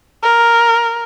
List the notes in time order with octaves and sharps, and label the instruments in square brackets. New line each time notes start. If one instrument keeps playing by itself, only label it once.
[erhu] A#4